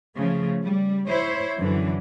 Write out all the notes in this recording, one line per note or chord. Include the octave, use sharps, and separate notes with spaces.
C#3 F3 A3
G3
E4 C5 C#5
F#2 D3 E3